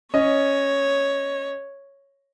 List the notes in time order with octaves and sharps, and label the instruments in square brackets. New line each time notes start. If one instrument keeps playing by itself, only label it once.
[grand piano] C#4 D#5 [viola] C#5